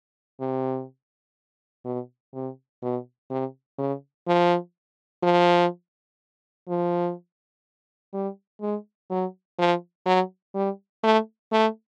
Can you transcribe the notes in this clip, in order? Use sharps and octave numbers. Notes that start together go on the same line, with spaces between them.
C3
B2
C3
B2
C3
C#3
F3
F3
F3
G3
G#3
F#3
F3
F#3
G3
A3
A3